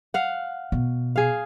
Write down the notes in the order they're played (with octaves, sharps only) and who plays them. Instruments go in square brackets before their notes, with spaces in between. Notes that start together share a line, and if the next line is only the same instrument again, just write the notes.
[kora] F5 F#5
[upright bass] B2
[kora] G#4 F5